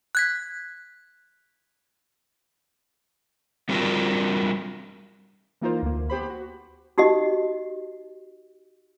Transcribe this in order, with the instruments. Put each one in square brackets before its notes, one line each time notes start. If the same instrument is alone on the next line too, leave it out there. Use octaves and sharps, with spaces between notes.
[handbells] F#6 G#6 B6
[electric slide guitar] G3 C4 D4 F4 F#4 A#4
[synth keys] E3 A#3 D#4 F4 A#4 C5
D2 A#3
B3 G4 C5 B5
F#4
[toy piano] D#4 F#4 G4 D#5